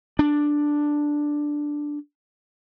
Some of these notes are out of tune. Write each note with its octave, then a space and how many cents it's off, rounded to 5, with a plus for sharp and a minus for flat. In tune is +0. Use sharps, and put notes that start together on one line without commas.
D4 +5